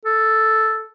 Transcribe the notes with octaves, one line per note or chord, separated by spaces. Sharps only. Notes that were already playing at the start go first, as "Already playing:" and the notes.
A4